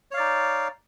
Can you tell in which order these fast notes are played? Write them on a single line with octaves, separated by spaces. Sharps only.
C#5 F5 D5 D#4